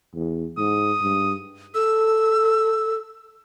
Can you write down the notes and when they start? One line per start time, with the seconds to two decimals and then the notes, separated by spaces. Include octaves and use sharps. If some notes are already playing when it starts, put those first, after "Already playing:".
0.14 E2
0.58 G#2 D#6
1.01 G2
1.74 A4 E6